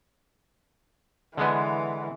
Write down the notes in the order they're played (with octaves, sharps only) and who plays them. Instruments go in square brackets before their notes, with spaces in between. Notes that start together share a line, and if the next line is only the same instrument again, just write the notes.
[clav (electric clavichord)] D3 G#3 B3 [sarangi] E3